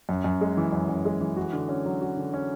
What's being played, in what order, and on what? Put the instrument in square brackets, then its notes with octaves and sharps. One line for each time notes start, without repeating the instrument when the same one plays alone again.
[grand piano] F#2
F#2
G#3
E3
F#2
F#2
G#3
E3
F#4
D3
C#4
F#3
F#4
D3
C#4